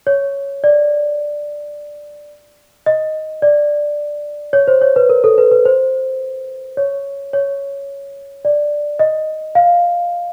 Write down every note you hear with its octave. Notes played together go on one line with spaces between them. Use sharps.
C#5
D5
D#5
D5
C#5
C5
C#5
B4
A#4
A4
B4
B4
C5
C#5
C#5
D5
D#5
F5